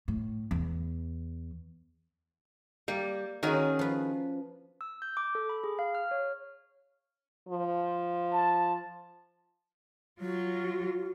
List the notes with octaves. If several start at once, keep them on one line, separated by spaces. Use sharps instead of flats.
A2
E2
G3 A#3
D#3 C#4 F#4 G#4 A#4
F3 B4
E6
G6
D6
A4
B5
G#4
F5
F6
C#5
F3
A5
F#3 F4 F#4